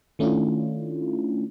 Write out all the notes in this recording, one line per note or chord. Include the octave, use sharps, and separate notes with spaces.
D#3 A3 C#4 D4 E4 F4